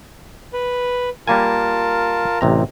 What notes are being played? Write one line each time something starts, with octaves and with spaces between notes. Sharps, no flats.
B4
G3 A#3 F4 A#4 G#5 A5
A1 C3 A#5